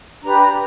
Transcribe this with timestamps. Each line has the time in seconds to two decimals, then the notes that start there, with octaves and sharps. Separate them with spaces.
0.23 D4 G4 B4 A#5
0.41 A#5